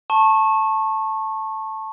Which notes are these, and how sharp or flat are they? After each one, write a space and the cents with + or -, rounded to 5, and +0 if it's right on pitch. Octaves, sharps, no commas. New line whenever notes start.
A5 +0 C#6 -25